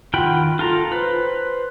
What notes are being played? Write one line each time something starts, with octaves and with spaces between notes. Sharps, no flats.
D#3 F4 F#5 G5 B5
F4 A4 A#5
B4 C5